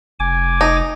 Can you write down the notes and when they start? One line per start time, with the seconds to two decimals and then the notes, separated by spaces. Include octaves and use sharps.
0.20 F1 G#5 D6
0.61 D#4